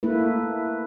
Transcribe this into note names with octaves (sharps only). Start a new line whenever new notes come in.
A3 A#3 E4 B4